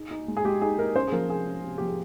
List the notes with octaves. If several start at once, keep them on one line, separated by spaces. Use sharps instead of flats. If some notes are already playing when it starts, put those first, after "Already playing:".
Already playing: D#4 G#4
D#4
G#3
G#4
G#3 G4
D#4 G#4
D#4 A#4
C#4 C5
G#4
F3 A#4
C3 G#4
C#4
C3
F3 G4
G#4